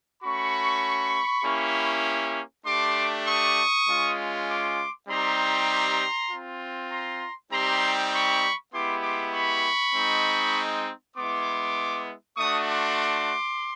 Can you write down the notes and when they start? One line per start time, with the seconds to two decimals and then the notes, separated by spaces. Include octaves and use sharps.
0.22 A3 C#4 F#4 B5 C#6
1.44 A#3 C#4 E4 G4
2.65 A3 D4 G4 C6 D6
3.26 C#6 D#6
3.87 G#3 C#4 F4
4.48 C6 D6
5.08 G3 C4 D#4 G4 A#5 C6
6.30 C4 F4
6.90 A#5 C6
7.51 G3 C4 D#4 G4 A#5 C6
8.12 B5 C#6
8.73 G#3 B3 E4 G4 C6 D6
9.03 C6 D6
9.34 B5 C#6
9.94 G#3 C4 D#4
11.16 G#3 B3 E4 C6 D6
12.37 A3 D4 F#4 C#6 D#6
12.67 C6 D6